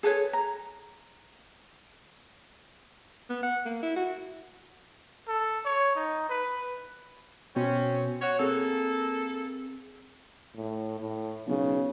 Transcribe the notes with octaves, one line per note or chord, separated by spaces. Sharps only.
G#4 A4 B4 C#5
A#5
B3
F#5
A#3
E4
F#4
A4
C#5
D#4
B4
B2 C4 C#4
F#4 C#5
A#3 C4 G#4 A4
A2
A2
B1 C#3